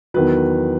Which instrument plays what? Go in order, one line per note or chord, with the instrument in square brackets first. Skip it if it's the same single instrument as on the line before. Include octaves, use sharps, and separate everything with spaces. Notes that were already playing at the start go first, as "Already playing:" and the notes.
[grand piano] E2 D#3 F#3 B4